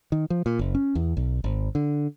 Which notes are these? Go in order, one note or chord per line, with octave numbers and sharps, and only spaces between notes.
D#3
F3
A#2
F#1
C#4
E2
B1
G#1
D3